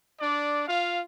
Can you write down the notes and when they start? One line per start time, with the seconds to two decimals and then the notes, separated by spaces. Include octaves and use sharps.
0.20 D4 D5
0.67 F4 F5